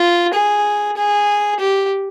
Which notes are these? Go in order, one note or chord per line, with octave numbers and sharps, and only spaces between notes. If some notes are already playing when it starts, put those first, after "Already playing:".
Already playing: F4
G#4
G#4
G4